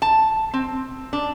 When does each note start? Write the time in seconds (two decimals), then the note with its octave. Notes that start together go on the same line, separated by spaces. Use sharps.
0.02 A5
0.54 C4
1.13 D4